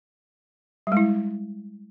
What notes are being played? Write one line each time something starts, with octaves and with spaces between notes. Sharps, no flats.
G3 G#3 E4